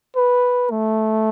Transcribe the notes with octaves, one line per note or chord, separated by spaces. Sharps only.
B4
A3